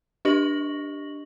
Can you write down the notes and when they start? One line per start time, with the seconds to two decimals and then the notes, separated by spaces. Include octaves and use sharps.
0.25 D4 G4 D#5 C#6 A#6 F#7